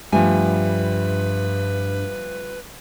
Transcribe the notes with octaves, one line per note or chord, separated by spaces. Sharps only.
G2 F3 G3 A3 B4 G#5